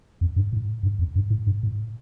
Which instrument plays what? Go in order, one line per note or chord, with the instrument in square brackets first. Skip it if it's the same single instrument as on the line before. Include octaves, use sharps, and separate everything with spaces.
[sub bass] F2
G2
A2
G2
F2
G2
A2
G2
A2